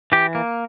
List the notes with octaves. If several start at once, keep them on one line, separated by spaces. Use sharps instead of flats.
E3 G4
A#3